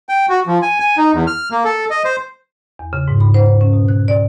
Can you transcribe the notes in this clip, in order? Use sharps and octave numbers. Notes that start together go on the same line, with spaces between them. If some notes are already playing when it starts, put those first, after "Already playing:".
G5
F#4
F3
G#5
G#5
D#4
E2
F6
A#3
A4
D#5
C5
E2
C#3
G#2
B5
C5
C5
C#4
B2
F#6
D5